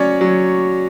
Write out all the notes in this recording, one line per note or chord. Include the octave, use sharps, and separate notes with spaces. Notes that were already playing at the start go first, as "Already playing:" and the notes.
Already playing: F#3 C#4 C#5 D5
F#3